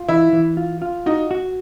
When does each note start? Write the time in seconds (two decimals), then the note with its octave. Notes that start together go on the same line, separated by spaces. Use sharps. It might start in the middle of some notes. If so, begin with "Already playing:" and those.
Already playing: F4
0.08 E3 E4
0.33 E3
0.57 F4
0.82 F4
1.06 D#4 F#4
1.31 F#4